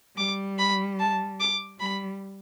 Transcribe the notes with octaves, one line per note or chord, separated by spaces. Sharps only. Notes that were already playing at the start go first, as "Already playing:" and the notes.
G3 D6
B5
A5
D6
G3 B5